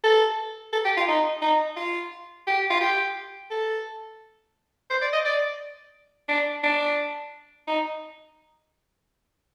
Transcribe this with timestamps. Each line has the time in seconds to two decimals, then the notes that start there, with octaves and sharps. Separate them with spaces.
0.04 A4
0.73 A4
0.85 G4
0.97 F4
1.08 D#4
1.42 D#4
1.77 F4
2.47 G4
2.70 F4
2.81 G4
3.51 A4
4.91 C5
5.02 D5
5.13 D#5
5.25 D5
6.29 D4
6.63 D4
7.67 D#4